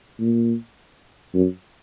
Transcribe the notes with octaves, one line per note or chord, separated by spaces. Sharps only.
A#2
F#2